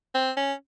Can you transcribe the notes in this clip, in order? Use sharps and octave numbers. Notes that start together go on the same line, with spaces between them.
C4
C#4